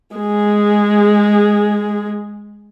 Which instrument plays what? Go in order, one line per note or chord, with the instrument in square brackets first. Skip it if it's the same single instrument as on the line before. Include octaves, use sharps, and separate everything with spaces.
[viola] G#3 G#4